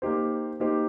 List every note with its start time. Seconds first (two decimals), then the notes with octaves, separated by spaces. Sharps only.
0.02 A#3 D#4 G4 C5
0.60 A#3 D#4 G4 C5